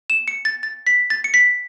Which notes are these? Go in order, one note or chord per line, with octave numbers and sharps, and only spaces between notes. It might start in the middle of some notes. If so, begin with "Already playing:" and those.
E7
C#7
A6
A6
B6
A6
C#7
B6